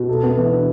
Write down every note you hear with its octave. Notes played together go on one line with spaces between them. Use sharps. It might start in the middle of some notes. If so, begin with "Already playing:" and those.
Already playing: B2
A4
B3
E3
D4